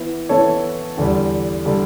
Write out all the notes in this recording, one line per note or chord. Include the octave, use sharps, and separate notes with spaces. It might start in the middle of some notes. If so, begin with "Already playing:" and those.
Already playing: E3 B3 E4
E3 B3 E4 A4 C#5
E2 D3 G3
D3 G3